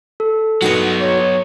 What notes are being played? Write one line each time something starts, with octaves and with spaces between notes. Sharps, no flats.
A4
G2 F#3 B3 D#4 F#4
C#5